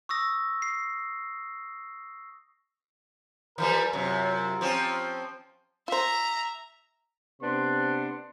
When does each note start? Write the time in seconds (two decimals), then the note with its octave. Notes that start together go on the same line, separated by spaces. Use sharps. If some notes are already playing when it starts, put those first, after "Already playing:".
0.09 C#6 D#6 E6 A#6
0.62 C7
3.58 E3 F3 G3 A#4
3.93 F#2 C3 F4 A#5
4.61 F3 C4 C#4
5.88 F4 C5 E5 A#5
7.41 C3 B3 D4 C6